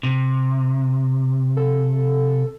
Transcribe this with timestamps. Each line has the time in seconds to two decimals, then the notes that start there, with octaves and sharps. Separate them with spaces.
0.03 C3
1.57 A4